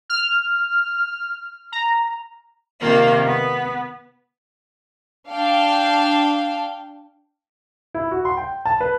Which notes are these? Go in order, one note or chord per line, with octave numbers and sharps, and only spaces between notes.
F6
A#5
C3 D#3 A#3 F4
B3
D4 F5 G5
E4
F#4
C6
G5
A5
B4